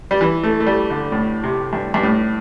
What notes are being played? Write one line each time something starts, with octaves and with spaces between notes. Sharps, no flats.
G3
E3
A3
A3
G3
D3
A2
C3
G2
G2
A2